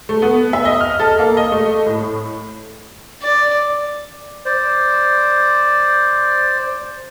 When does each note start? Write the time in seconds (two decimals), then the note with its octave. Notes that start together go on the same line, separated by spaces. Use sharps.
0.09 A3
0.22 B3
0.53 E5
0.65 D#5
0.80 F6
0.99 A4
1.19 A#3
1.37 D#5
1.52 A3
1.86 A2
3.22 D5
4.45 C5 D5